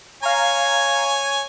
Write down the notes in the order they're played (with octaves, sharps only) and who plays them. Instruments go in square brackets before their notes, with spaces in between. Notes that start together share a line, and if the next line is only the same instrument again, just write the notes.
[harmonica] C#5 G#5 [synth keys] F5 A#5